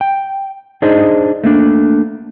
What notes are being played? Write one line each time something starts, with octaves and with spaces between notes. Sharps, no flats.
G5
D4 D#4 G#4 C5 D#5
A3 A#3 D4